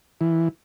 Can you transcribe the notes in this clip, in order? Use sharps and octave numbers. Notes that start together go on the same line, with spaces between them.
E3